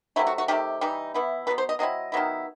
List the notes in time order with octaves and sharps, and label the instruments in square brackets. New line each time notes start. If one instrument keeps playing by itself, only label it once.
[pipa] C3 F#3 A3 E4
F#4
F#4
C3 D#3 A3 G4
E3 G3 D#4
E3 B3 E4
B2 F#3 B3 B4
C5
D#5
F#3 C4 E4 D#5
D#3 F#3 B3 E4